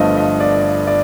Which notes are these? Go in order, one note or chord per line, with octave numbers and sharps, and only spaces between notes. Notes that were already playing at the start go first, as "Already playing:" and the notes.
Already playing: G1 G2 F3 A3 D#5
D#5
D5
D5